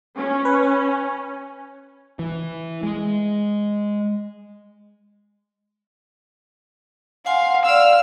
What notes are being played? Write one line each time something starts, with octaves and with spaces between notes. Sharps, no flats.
C#4
B4
G#5
E3
G#3
F5 F#5 G#5 C6
D5 F5 E6 F6